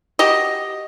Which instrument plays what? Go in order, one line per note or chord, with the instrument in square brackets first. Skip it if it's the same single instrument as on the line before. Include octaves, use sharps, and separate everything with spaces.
[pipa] F#4 G4 D#5